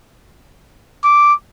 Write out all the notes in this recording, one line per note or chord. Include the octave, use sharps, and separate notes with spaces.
D6